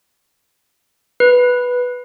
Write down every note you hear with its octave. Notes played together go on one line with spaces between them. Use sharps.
B4